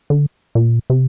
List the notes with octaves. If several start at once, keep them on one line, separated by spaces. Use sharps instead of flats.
D3
A#2
C3